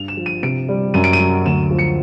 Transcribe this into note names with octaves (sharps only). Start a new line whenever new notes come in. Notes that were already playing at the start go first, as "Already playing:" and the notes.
Already playing: G2 F7
E7
F3
D#7
C3 D7
G3
F#2 D#7
D7
D#7
F#3
D2 E7
F3
C#7